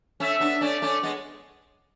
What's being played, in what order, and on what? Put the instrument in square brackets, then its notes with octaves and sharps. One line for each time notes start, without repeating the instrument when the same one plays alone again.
[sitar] A3 C#4 [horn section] E5
[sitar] B3 D4
[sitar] A3 C#4 [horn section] D5
[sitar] A3 C#4
G#3 B3